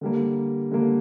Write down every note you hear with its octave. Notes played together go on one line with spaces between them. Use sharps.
D3 G3 A#3
D3 G3 A#3